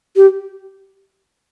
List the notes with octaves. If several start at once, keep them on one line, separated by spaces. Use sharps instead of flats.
G4